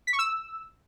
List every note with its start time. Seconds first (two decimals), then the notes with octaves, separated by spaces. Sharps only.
0.07 B6
0.13 C#6
0.19 E6